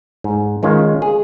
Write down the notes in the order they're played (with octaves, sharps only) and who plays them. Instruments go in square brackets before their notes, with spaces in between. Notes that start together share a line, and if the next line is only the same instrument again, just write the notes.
[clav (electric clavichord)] G#2
D#3 G#3 C#4 F4
G#4